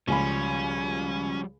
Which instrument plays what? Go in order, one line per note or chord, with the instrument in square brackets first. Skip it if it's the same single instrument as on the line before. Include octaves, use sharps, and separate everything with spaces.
[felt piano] C#2 G#5 B5 [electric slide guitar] F3 G3 [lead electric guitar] C#4